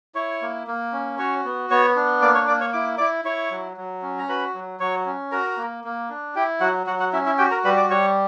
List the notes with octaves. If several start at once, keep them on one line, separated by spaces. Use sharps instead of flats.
E4 C#5 C#6
A#3
A#3
C#4
F#4 C#5 C#6
B3
B3 C#5 C#6
D4
A#3 D5 D6
C#5 C#6
A#3 D5 D6
C#5 C#6
E4 D6
E4 D5 D6
E4 C#5 C#6
F#3
F#3
C#4
A#5
F#4 B4 B5
F#3
F#3 C#5 C#6
C#4
F#4 A#4 A#5
A#3
A#3
D4
E4 G4 G5
F#3 F#4 F#5
F#3 F#4 F#5
F#4 F#5
C#4 E4 E5
E4 E5
F#4 G4 G5
A#4 A#5
G3 B4 B5
D5 D6
G3 C#5 C#6